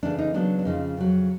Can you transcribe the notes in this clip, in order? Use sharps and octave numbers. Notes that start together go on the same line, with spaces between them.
C#3 E3 A3 D4
D#4
C#3 F#3 B3 D4
D4
F2 C#3 F3 D#4
F2 C#3 F#3